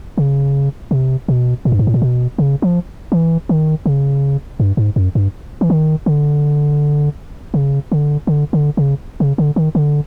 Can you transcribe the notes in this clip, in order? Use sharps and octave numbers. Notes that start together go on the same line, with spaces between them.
C#3
C3
B2
A#2
G2
G#2
A2
A#2
B2
C#3
F3
E3
D#3
C#3
G2
G#2
F#2
G2
E3
D#3
D3
C#3
D3
D3
D3
C#3
C#3
D3
D#3
D3